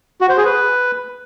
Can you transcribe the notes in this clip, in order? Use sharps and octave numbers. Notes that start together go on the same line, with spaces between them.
F#4
C5
G#4
B4